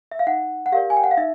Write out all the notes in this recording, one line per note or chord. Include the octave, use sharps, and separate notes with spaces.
E5
F5
D#4 F#5
F#5
G4 A#4 D5 F5
G#5
G5
F#5
F5
D#4 E5